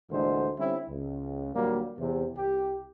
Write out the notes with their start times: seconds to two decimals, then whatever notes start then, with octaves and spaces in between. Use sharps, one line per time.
0.11 D2 A#2 D3 E3 G#3 C5
0.58 D3 G3 C4 C#4 E4
0.90 C#2
1.55 D2 A#2 F#3 G3 A#3
1.98 E2 C3
2.36 C2 G4